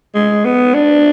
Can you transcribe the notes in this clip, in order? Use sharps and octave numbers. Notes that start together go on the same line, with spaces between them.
G#3
B3
D4